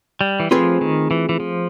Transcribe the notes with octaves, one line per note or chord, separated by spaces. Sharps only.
G3
E3
F3 A3 C4 F4 G#4 B4
D#3
E3
E3
F3